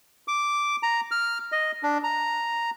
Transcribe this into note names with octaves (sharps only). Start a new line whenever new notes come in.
D6
A#5
F6
D#5
D4
A#5